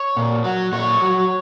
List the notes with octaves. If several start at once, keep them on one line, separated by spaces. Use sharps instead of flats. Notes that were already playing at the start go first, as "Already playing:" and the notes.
Already playing: C#5
A#2
F#3
A#2 C#5
F#3